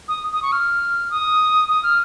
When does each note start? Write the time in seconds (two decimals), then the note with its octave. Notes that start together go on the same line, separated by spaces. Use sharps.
0.08 D#6
0.33 D#6
0.42 C#6
0.52 F6
1.11 D#6
1.69 D#6
1.83 F6